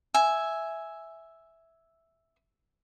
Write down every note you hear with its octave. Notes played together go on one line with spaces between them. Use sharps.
E5 G#5